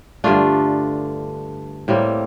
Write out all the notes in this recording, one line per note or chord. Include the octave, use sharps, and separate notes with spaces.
G2 D3 A3 D4 F4
A2 G3 A#3 C4